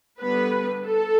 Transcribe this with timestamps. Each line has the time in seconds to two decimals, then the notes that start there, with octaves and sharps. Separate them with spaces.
0.21 D3 G3 B3 B4
0.84 A4